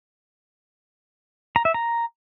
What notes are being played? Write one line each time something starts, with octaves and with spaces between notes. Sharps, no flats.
A#5
E5
A#5